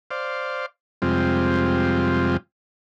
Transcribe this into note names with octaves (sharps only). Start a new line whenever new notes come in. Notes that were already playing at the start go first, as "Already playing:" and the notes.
C5 D5 F5
F2 C3 G3 G#3 C4 F4